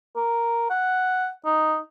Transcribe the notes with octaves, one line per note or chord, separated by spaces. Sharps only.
A#4
F#5
D#4